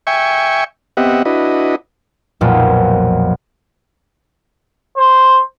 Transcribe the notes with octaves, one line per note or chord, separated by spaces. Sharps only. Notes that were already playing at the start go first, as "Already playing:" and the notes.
E5 G5 G#5 C#6
B3 C4 G4 D#5 E5 F#5
D4 E4 F#4 B4 D#5
B1 F2 A#2
C5